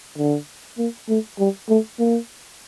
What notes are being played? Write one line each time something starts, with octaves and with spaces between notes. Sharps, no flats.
D3
A#3
A3
G3
A3
A#3